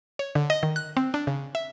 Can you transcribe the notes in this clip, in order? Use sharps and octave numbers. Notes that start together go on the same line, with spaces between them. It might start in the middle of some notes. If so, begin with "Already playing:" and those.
C#5
D3
D#5
D#3
F#6
C4
D4
C#3
E5